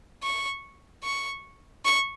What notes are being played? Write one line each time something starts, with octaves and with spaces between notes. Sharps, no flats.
C#6
C#6
C#6